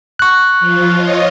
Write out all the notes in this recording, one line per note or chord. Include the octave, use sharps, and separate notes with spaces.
C#6 F#6
F3 F4
F4 C#5 D#5